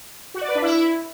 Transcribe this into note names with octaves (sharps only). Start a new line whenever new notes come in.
F#4
D5
B4
D4
E4